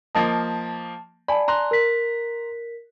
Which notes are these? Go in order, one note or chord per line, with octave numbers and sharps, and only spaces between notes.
F3 A#3 D#5 A5
D5 G#5 A5 B5
A#5 C6 F#6
A#4 B6